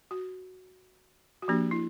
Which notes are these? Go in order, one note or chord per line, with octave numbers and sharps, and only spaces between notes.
F#4
F#4
F3 A#3 D4 G4
E4